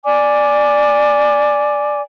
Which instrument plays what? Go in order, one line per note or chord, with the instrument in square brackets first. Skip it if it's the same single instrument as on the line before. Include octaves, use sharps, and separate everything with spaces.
[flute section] D5 G#5 D6